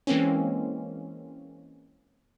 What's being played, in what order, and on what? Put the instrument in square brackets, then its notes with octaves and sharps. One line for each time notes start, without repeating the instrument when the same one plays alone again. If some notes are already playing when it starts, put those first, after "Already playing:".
[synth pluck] E3 G#3 A#3 C4 C#4